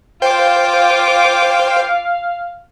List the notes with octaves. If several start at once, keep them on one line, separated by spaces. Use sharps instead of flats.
F4 C5 F5 G5 D6